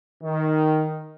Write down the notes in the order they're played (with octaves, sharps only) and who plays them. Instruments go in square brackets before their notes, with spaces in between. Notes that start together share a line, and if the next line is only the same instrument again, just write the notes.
[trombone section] D#3